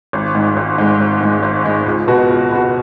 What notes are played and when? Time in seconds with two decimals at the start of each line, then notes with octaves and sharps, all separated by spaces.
0.13 G#1
0.35 G#2 G#3
0.57 G#1
0.78 G#2 G#3
1.00 G#1
1.21 G#2 G#3
1.43 G#1
1.64 G#2 G#3
1.86 C#2
2.07 B2 B3 F#4
2.30 C#2
2.51 B2 B3 F#4